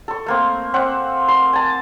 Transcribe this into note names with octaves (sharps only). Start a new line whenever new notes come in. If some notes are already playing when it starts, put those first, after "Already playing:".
A4 C#6
A3 A#3 C4
C4 E5 F#5
C6
G#5 A5